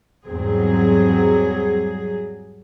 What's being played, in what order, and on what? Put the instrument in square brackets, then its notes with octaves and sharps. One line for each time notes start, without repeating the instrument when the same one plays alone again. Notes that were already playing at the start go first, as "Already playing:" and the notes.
[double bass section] E2 G#2 C4 [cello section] F#3 G3 G#4